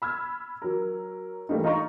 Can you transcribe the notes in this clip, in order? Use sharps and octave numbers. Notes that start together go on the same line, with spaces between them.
B5 E6 F6 G#6
F#3 A#4
E3 G3 A3 A#3 D#4
D#4 F4 D#5 A#5 C#6